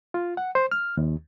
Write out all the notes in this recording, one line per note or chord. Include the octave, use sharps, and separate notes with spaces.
F4
F#5
C5
F6
D#2